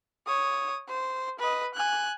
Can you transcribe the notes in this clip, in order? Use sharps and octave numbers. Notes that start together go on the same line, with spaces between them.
C#5 D#6
C5
B4 D#5
G#5 F#6